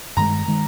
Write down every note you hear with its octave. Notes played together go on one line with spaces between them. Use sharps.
G2 D#3 G#3 A#5
D#3 G#3